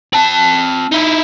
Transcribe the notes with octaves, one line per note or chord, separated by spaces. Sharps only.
C4 A5
D#4 E4